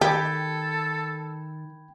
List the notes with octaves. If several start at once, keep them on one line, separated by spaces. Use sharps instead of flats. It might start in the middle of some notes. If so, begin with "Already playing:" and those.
D#3 G4 A4 G5 B5 G#6